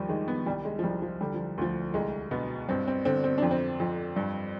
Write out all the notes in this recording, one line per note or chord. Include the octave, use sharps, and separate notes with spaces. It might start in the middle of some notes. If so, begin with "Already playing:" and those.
Already playing: D#2 F3 G3
D#3 G#3
B3
C2 G3
G#3
F3
C2 G3
F3
D3 G3
F3
D2 F3
C2 G#3
B2 B3
G2 C4
C4
D3 C4
C4
F2 D4
C4
F2
G2